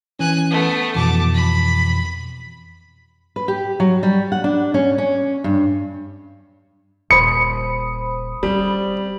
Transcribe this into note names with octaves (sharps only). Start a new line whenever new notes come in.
E3 C#4 G#5 F#6
A3 B3
F2 B2 E3 A5 D6
B5
B4
G4
F#3
G3
F#5
D4
C#4
C#4
G2
D#1 C5 B5 D#6 C#7
G3 C4 C#4